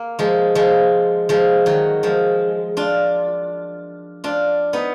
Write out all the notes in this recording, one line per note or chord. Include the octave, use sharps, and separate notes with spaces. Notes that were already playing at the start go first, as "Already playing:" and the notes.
Already playing: A#3
F3 G#3
F3 G#3
F3 G#3
D#3 F#3
F3 G#3
D4 F4
D4 F4
B3 D#4